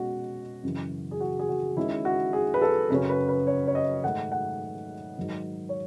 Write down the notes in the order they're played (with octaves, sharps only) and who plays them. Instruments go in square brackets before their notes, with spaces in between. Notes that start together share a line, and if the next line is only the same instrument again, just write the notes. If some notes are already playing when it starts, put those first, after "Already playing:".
Already playing: [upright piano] B2 G#3 C#4 F#4
F#2 C#3 E3
G#4
F#4
G#4
F#4
D#3 G#3 C#4 E4
F#4
G#4
B4
A4
F#2 C#3 F#3 C#4 B4
B4
B4
C#5
C#5
D#5
G#2 D#3 A3 D#4 F#5
F#5
G#2 D#3 F#3
C#5